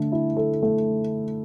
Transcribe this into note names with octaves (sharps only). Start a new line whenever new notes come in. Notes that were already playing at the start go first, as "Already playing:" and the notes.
Already playing: D3 A3 A4
E4
A4
A3